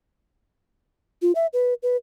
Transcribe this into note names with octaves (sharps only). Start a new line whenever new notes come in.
F4
E5
B4
B4